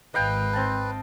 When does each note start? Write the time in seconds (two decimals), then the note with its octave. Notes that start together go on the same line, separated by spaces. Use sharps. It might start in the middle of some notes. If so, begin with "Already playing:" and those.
0.14 G#1 B4 D#5 F5 G5
0.53 C4 A5